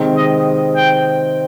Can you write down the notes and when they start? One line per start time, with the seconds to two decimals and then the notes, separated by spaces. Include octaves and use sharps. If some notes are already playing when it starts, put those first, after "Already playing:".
Already playing: C3 D#3 G#3 C4
0.17 D#5
0.76 G5